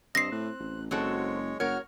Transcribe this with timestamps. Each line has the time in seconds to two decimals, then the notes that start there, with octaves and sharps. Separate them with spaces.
0.15 G2 C4 D#5 A#6 C7
0.32 A2 F#6
0.60 A1
0.91 F#1 G#3 C4 F#4 A4 C#5
1.60 F#1 F#4 A#4 C#5 F6